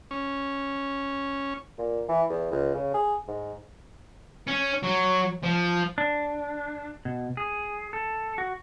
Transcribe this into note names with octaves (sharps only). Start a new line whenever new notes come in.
C#4
A#2
E3
E2
C#2
C#3
G#4
G#2
C#4
F#3
F3
D4
B2
G#4
A4
F#4